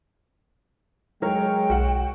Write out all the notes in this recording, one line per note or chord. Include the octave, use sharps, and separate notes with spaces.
F#3 G#3 A#4 C#5 G5
B1 F#4 F#5